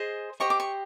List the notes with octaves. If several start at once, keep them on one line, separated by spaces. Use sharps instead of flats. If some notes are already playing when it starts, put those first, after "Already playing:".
Already playing: G#4 C5 D#5
G4 C5 D#5 C#6
D6
C#6